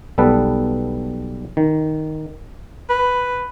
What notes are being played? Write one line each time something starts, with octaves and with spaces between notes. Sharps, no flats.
B1 G3 B3 A4 B4
D#3
B4